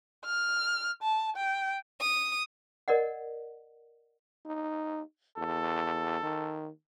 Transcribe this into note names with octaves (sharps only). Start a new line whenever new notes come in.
F6
A5
G5
D#6
A#4 D5 D#5 F#5
D#4
E2 A4
D#3